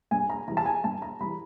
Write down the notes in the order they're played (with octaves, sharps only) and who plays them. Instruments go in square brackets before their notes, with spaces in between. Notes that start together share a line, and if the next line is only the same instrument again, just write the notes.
[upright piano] G2 G#5
A#5
E3 G3 A#5
A5
G#5
G2 A5
A#5
E3 G3 B5